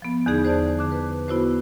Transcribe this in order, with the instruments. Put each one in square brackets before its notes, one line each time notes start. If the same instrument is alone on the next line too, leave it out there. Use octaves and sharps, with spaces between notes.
[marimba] F3 B3
E2 D3 D#4 G#4
G#4 C5 D5 A5
D3 D6
B4
B3 E4 F#4 C5